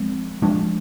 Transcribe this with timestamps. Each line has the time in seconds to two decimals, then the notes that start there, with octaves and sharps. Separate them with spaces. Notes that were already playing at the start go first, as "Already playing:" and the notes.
Already playing: F3 G#3 C4
0.42 F3 G#3 D4